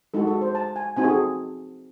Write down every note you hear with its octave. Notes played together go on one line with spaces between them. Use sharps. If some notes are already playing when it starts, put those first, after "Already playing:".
G#3 D#4 F#4 A4
A4
C5
A5
G#5
C4 D#4 F#4 G#5
G#4
A4